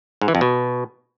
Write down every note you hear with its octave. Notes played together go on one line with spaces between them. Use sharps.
G#2
E3
F2
B2